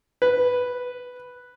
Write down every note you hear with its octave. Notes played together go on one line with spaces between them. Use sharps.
B4